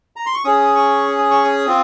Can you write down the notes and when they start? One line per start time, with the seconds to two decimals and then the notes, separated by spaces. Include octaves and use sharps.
0.16 A#5
0.26 C6
0.34 C#6
0.45 C#4 G#4 D#6
0.75 C#6
1.18 D#6
1.31 C#6
1.45 D#6
1.67 C4 F4